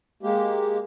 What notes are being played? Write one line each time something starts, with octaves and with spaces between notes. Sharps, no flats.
G#3 A#3 G4